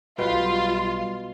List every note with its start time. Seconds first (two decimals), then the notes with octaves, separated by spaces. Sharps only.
0.18 B1 B2 G3 F4 B4 G5 C6